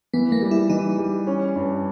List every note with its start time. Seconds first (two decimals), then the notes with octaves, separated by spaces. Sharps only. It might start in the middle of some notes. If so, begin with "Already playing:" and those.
0.14 E3 B3
0.32 A#3
0.42 G3
0.51 E4
0.70 E3 D#4
0.99 G3
1.27 C#4
1.55 G2